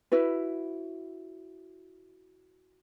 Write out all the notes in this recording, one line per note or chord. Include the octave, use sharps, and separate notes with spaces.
E4 F#4 B4